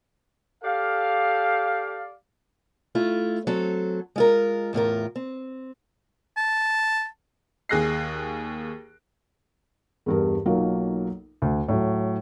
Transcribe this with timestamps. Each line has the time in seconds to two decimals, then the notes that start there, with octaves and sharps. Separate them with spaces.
0.64 G4 A4 D5 F5
2.95 A3 E4 F4
3.47 F#3 C4 A4
4.16 G#3 F4 A#4
4.73 E2 A2 F4 A#4
5.16 C4
6.37 A5
7.69 D#2 G#4 F#6 A#6 C7
10.06 E2 G2 A#4
10.46 B1 F#3 A#3 D#4 F4 A#4
11.42 D2
11.68 A2 F#3